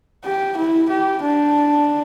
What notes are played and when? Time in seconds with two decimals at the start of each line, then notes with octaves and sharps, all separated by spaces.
0.25 G4
0.58 E4
0.89 G4
1.23 D4